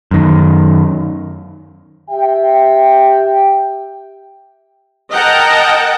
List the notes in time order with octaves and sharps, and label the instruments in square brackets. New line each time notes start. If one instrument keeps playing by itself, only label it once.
[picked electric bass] F#2 D#3
[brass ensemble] G4 E5 G5
[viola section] A#4 D#5 F#5 G5 A5